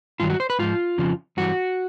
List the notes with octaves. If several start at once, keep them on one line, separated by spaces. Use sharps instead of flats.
G2 D#3 F#3 F4
F#4
C5
B4
G#2 F3 F4
F2 C#3 F3
G2 E3 G3 F#4